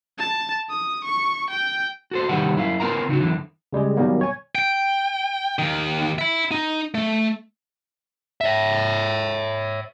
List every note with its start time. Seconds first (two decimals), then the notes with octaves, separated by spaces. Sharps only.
0.18 A5
0.70 D#6
1.05 C#6
1.50 G5
2.11 F#4 A4 C5
2.29 C2 D#3 G3 G4 B4 F#5
2.56 F#2 E4 F5
2.80 B3 C4 F4 A#4 F#5 A#5
3.09 C#3 D#4 E4 F#4
3.21 F#2 D3 E3
3.73 C#3 G3 G#3 G#4
3.97 B2 D#3 F#3 G3 A#3 B3
4.21 C#5 G#5
4.55 G5
5.59 D#2 D#3
6.19 E5 B5
6.51 D#4
6.95 A3
8.41 C#5 E5